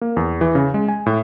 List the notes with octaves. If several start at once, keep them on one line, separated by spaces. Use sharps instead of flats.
A#3
E2
E3
C#3
G#3
G#5
A2